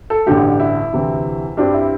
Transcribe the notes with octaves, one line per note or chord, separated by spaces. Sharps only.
A4
A1 G2 D3 A3 G4
E4
D2 C3 E3 C4
G2 G3 C4 D4
E4